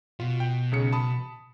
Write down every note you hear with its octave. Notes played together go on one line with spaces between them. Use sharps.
B2 F4
G5
B1 C#3 C#7
A5 B5 D#6